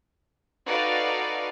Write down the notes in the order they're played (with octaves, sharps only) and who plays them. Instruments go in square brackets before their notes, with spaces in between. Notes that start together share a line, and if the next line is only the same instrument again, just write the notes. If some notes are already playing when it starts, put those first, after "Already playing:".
[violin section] D#4 F#4 A4 B4 D5 F5